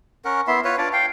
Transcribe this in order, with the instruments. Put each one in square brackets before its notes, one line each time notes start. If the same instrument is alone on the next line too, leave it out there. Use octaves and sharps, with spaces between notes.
[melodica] C#4 A#4 F#5
B3 E4 E5 C6
F4 B4 C#5
D4 F4 C#5 D5
F5 G5